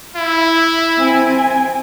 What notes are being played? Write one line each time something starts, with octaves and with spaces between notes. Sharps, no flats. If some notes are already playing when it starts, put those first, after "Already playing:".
E4
C4 G#5